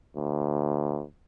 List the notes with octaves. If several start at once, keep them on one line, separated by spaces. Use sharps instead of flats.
D2